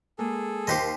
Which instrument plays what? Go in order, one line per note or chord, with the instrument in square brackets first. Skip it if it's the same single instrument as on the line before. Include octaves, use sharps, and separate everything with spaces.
[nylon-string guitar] G#3 A#3 [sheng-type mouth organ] G#4 A4
[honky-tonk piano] D#2 B6 C7 [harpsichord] G4 C5 D#5